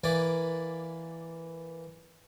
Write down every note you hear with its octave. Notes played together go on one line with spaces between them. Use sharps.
E3 A#3 B4 D5 G#5 D6